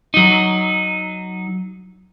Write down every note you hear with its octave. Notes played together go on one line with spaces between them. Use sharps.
F#3 D#4